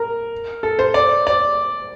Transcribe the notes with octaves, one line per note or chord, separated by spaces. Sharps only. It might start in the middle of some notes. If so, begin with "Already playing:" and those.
Already playing: A#4
A4
C5
D5
D5